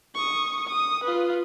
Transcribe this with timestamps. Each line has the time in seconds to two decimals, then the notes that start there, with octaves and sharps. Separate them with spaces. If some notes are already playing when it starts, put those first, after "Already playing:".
0.15 C#6 D#6
0.67 D#6
1.04 F4 B4